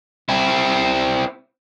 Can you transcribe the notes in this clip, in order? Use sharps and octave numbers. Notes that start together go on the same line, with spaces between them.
C4 E4